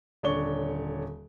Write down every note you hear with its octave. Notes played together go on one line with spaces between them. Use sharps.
D#1 D3 C#5 D5 C#6 G7